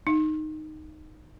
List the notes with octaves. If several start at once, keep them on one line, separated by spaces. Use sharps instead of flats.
D#4